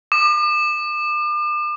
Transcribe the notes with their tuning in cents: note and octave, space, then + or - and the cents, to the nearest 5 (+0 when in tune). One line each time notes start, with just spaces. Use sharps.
D6 +40